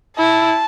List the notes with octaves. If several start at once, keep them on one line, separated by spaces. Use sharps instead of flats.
E4 A5